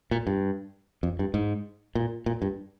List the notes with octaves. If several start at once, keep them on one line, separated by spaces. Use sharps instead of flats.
A#2
G2
F2
G2
G#2
A#2
A#2
G2